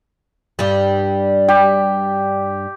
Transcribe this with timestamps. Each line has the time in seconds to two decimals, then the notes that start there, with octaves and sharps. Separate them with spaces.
0.59 G2 G3
1.48 G4